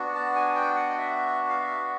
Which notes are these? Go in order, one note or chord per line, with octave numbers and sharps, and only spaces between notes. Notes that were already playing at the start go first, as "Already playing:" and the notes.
Already playing: B3 D4 F#4
A5
G#5
G5
F#5
D#5
E5
F5
E5